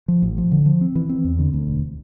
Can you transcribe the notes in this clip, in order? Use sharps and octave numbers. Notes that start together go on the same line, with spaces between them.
F3
A1
F3
D3
F3
C4
E3
C4
E2
D3
D2
E1